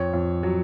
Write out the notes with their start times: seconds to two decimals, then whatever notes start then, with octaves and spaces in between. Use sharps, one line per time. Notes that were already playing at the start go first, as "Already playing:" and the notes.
Already playing: F2 C#5
0.13 F2
0.43 F#3